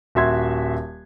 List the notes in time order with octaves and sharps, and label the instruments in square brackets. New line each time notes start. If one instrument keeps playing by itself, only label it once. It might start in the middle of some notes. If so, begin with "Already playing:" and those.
[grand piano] D#1 F#4 E5 C6 G#6